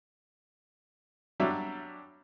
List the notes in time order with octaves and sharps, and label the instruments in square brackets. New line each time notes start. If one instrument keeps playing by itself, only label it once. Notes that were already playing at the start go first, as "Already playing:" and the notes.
[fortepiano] F#3 G3 D4 E5